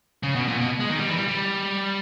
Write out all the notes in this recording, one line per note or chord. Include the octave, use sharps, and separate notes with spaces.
C#3
B2
A#2
B2
G#3
D#3
G3
E3
G3
G3